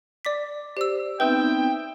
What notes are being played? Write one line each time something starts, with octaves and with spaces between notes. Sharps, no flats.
D5 D6 B6
G4 C5 D5 E6
B3 C4 D#4 B4 E5 G5